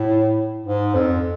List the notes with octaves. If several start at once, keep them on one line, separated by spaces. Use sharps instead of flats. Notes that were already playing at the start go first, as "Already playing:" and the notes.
Already playing: A2
G#2
F2